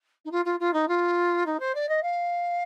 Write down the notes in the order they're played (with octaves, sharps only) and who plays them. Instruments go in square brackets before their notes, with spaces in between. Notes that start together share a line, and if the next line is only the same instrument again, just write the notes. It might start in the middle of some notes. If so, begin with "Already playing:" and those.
[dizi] D#4
F4
F4
F4
D#4
F4
D#4
C5
D5
D#5
F5